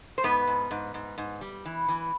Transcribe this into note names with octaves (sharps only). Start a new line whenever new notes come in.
C5
G#2 B3 B4
G#2
G#2
G#2
G#2
G3
E3
E3